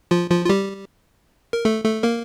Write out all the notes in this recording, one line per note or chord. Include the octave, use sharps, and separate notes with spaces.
F3 F4
F3 F4
F4
G3 G4
A#4
A3 A4
A3 A4
A#3 A#4